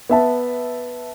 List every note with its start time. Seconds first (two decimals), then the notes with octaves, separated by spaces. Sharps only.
0.09 B3 E5 A5